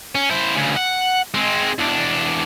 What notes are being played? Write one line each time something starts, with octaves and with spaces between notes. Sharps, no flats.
C#4
E4 C5
D2 C#3
F#5
G#3 C4
E2 D4